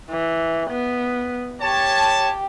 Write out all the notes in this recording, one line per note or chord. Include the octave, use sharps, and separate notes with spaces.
E3
B3
G4 C#5 A5